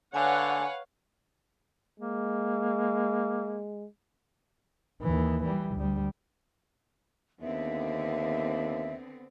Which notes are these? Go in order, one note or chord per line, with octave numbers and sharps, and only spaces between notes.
D3 B4 C#5 F5 F#5 G#5
G#3 A#3
D#2 E3
E3 G3
D2 G3
D#2 D3 B3 C4 E5